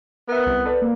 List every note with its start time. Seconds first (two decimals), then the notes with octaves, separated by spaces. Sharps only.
0.28 B3 A#4 E5
0.46 C2
0.65 A4 B4 D5
0.82 A#3